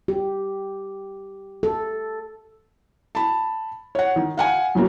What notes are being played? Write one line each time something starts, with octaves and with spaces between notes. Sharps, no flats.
G4
A4
A5 B5
C#5 F#5
D#3
F5 F#5 G#5
F#2 C#3 F#3 A#3 F#4